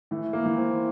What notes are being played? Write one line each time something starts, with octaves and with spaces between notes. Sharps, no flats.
E3 A3
A#3
E3
C4